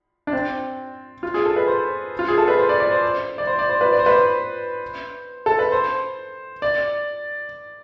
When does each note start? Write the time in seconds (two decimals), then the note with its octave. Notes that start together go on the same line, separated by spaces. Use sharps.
0.27 D4
0.33 C4
1.23 F4
1.34 G#4
1.46 A4
1.56 B4
1.68 C5
2.19 F4
2.28 G#4
2.38 A4
2.48 B4
2.58 C5
2.69 D5
2.80 D5
2.91 C5
3.38 D5
3.47 C5
3.59 D5
3.70 C5
3.81 B4
3.92 D5
3.99 C5
4.06 B4
4.14 C5
5.46 A4
5.59 B4
5.72 C5
6.62 D5